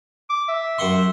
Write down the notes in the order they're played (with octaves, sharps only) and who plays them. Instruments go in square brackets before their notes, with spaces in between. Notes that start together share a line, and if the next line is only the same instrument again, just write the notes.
[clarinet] D6
E5
[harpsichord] F#2 F#5 C6